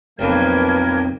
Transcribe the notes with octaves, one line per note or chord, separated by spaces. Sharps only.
B1 F2 F3 A#3 A#4 B4 G#6